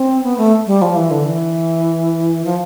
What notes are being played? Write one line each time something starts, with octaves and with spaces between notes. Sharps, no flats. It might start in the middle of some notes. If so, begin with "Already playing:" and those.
Already playing: C4
B3
A3
G3
F3
E3
D3
E3
F3